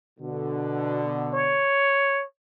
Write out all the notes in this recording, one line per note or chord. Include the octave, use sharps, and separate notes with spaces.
B2 D3
C#5